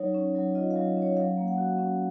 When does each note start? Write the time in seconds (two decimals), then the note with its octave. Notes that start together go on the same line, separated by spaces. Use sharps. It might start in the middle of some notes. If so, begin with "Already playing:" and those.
Already playing: F#3 D#4 C#5
0.14 C#4
0.35 F#3
0.55 F4 D#5
0.71 F5
0.76 F#3
0.86 F5
0.97 C#4
1.02 C#5
1.17 F#3 F5
1.37 A#3
1.48 F#5
1.58 F#4
1.78 C#4